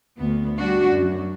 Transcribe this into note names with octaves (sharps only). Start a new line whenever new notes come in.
D2 B3
G3 D4 F#4
F#2